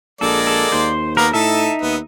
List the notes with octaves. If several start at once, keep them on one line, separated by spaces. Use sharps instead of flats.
A#1 G#3 A#3 A4 D5
A4
D#2 C5
A#3 B3 A#4
A2 D#4 A4 E5 A5
D#2 B3